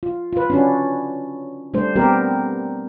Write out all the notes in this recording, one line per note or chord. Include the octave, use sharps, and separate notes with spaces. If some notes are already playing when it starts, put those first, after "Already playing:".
F4
F4 B4
C#4 D4 F#4
G3 A3 D4 C5
G3 B3 C4 G4 A#4